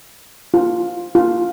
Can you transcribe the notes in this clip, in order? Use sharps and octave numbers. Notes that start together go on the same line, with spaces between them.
F4
F4